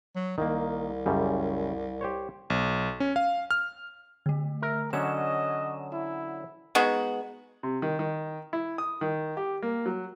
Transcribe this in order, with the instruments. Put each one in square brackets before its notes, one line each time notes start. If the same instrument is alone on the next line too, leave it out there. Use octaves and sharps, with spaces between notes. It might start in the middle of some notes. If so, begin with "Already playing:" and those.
[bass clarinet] F#3
[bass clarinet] C2 [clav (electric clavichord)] D#3 A#3
[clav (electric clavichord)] F#2 C#3 G3
G4 C5 C#5
[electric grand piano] B1
C#4
F5
F6
[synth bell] D3 A3
[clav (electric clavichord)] A#4 [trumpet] E5
[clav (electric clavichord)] D3 F#3 C#4 [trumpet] D#5 [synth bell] E7
[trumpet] E4
[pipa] G#3 B3 D#4 F#4
[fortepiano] C3
D#3
D#3
E4
D#6
D#3
G4
A#3
F#3